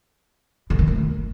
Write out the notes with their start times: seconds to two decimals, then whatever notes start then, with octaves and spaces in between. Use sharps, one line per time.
0.70 D3
0.79 D#3
0.88 A3